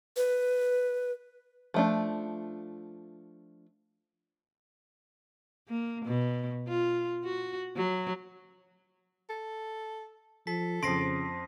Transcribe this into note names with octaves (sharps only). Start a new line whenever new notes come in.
B4
F3 A3 D4
A#3
B2
F4
F#4
F#3
A4
F3 A4 B6
F2 C#3 C4 C6 A#6 C7 D7